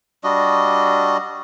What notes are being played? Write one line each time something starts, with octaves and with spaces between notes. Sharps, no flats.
G3 D4 F#4 D#5